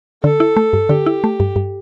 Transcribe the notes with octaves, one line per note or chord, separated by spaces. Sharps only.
D3 A4
E4
A3
G2
D3 G4
E4
A3
G2
G2